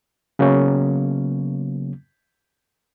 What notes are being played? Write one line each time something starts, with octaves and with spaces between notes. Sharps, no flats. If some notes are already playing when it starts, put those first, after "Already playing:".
C#3 F#3 A#3 B3 C#4